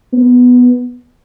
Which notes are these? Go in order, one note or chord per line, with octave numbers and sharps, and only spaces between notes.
B3